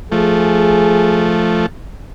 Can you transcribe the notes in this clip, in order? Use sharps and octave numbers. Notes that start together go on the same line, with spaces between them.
F3 A3 G#4